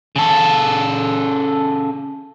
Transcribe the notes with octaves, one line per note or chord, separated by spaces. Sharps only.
C#3 A4